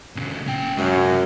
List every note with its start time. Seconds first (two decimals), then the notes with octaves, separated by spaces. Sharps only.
0.16 A#2 C#3
0.47 C#4 G5
0.77 C2 F#2 G#3